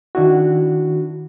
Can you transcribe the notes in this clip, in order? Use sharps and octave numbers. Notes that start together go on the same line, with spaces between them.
D#3 D4 E4 F#4